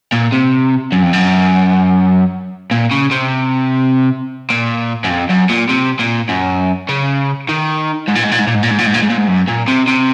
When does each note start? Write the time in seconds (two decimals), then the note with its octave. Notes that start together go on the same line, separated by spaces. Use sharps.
0.12 A#2
0.32 C3
0.92 F#2
1.03 F2
1.13 F#2
2.71 A#2
2.91 C#3
3.11 C3
4.50 A#2
5.04 F#2
5.10 F2
5.30 F#2
5.50 A#2
5.69 C3
5.99 A#2
6.29 F#2
6.89 C#3
7.49 D#3
8.08 G#2
8.16 A#2
8.24 G#2
8.32 A#2
8.40 G#2
8.47 A#2
8.55 G#2
8.63 A#2
8.70 G#2
8.78 A#2
8.86 G#2
8.94 A#2
9.02 G#2
9.10 A#2
9.17 G#2
9.28 F#2
9.48 A#2
9.68 C3
9.87 C3